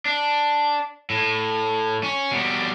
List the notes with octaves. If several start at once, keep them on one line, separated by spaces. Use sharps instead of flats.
D4
A2
C#4
B2 G3